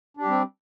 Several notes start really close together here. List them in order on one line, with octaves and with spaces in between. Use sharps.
D4 G4 G3 C4